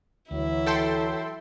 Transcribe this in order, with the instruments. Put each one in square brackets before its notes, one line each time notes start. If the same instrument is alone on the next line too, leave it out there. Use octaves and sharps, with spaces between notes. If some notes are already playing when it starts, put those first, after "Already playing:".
[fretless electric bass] D2 [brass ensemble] E3 F#3 [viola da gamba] E4
[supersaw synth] A4 G5 C6